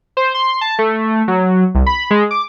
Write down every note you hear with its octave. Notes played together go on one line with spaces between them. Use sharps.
C5
C6
A5
A3
F#3
C2
B5
G#3
D6